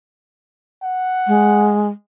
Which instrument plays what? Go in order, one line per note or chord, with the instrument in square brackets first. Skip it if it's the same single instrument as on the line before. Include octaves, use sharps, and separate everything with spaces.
[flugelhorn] F#5
[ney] G#3